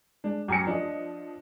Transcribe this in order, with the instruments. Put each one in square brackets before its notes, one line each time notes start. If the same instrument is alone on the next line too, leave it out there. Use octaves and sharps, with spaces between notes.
[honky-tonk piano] G#3 [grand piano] D4
[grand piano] F#2 A#5 C#7 [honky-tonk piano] G5 G#5 D6
[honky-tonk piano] F3 D#5 [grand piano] D4